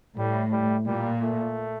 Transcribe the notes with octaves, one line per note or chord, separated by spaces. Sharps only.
A2 G3
G3
A#2 G3
A3